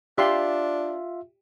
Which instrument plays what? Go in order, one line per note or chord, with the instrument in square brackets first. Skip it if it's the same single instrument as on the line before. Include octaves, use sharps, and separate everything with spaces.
[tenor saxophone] D4 [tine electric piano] F4 E5 [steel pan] G4 C6